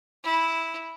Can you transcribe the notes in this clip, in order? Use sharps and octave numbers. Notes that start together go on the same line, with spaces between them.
E4